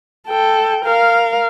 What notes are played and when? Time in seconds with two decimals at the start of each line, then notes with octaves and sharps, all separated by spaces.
0.28 A4 G5
0.85 A#4 F5